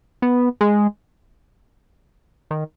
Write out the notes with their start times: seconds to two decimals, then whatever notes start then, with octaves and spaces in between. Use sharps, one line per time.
0.22 B3
0.61 G#3
2.51 D#3